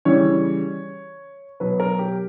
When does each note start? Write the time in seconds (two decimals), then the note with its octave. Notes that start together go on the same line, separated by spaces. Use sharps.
0.05 C#3 E3 G3 C#5
1.60 B2 F#3 B4
1.80 A#4
1.99 G4